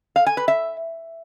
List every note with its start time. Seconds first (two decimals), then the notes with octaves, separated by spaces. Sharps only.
0.16 F5
0.26 G#5
0.37 B4
0.48 E5